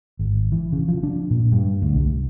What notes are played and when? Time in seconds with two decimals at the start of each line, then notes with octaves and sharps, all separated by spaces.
0.19 G#1
0.52 E3
0.72 C#3
0.88 F3
1.03 D4
1.31 A#2
1.52 G2
1.82 D2
1.95 C2